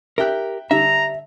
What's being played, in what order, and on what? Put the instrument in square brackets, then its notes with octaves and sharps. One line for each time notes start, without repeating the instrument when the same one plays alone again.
[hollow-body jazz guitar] G4 A#4 [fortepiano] E5 G5 F#6
[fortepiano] D3 G3 [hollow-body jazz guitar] E5 [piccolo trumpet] A#5